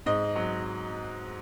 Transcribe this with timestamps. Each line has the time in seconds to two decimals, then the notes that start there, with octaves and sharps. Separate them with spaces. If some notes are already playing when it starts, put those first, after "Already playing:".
0.06 G#2 D#5
0.36 F#3